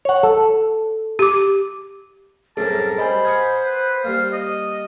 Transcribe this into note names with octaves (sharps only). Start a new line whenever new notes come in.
C#5 F#5
A4
G4 D6
C2 F#2 A2 G#4 A#4 A5
G3 C5 D#5 G#5 B5
A#4 D#5 F#5 G#6
B4
G3 A#3 F5
D#5